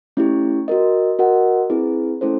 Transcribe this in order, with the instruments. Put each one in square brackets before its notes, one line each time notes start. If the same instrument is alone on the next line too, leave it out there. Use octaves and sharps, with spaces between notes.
[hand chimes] A3 C#4 E4 G4
F#4 A#4 D#5
F#4 A#4 D#5 F#5
C4 E4 G#4 B4
A3 C#4 E4 A4 C5